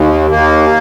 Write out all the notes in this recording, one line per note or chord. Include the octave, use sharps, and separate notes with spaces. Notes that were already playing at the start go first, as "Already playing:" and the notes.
Already playing: D#2
D#2 A#3